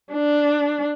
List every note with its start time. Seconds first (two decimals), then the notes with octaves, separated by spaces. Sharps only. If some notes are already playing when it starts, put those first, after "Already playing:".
0.13 D4